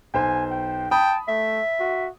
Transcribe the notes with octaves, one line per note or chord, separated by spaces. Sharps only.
B1 C5 G#5
G5
G5 A5 B5 D#6
A3 E5
F#4